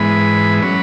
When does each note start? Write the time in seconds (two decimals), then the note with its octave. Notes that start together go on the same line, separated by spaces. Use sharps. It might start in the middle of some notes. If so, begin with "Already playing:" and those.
Already playing: G#2 E3 G#3 B3 B5
0.62 F#3 C#4 B5